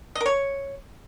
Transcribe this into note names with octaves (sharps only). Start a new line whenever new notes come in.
D#5
A#4
C#5